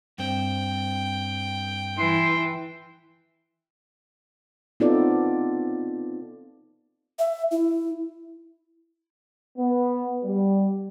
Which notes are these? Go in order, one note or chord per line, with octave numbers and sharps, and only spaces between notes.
G2 C4 G5
E3 C6
B3 C4 D#4 F4 A4 D5
E5
E4
B3
G3